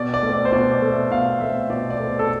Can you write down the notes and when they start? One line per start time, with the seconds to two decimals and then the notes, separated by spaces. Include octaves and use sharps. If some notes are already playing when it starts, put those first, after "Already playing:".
Already playing: B2 D5
0.14 D5
0.23 A3 C4
0.33 D5
0.45 C5
0.52 B2 D5
0.72 D5
0.82 A3 C4
0.92 E5
1.11 B2 F5
1.41 A3 C4 E5
1.70 B2 D5
1.90 D5
2.00 A3 C4
2.19 A4